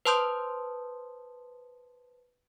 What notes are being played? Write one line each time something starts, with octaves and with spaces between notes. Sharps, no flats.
B4 C5 A5 C6 D#6 G6